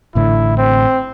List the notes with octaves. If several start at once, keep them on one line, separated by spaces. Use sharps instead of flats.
A1 A2 D3 E4
C4